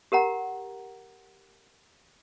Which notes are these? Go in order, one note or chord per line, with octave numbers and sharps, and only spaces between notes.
G4 A#4 F#5 A#5